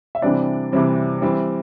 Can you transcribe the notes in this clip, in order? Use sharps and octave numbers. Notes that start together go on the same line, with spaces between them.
E5
C3 E3 G3 C4 D4 D5
C3 E3 G3 C4
E3 G3 C4